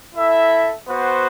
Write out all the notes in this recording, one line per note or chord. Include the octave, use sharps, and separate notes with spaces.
E4 A4 E5
B3 F#4 C5